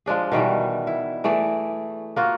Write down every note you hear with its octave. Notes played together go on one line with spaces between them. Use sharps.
F3 G#3 D4 G#4
B2 D#3 E3 G3
E4
E3 A3 G#4 D5
A#3 F4 F#4